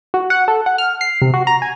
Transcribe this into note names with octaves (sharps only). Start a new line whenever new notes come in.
F#4
F#5
A4
F#5
F6
C7
C3
F#4
A#5
G#5